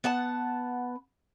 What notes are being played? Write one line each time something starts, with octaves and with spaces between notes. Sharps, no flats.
B3 F#5 A5